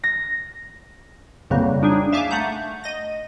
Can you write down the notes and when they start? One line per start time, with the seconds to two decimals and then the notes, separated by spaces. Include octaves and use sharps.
0.04 A#6
1.50 B1 F2 C#3 F#3 G3 A#3
1.82 G3 D4 D#4 G#4
2.12 E5 F5 G#5 A5 D6
2.31 A3 F#5 A#5 G6
2.84 D#5 A#6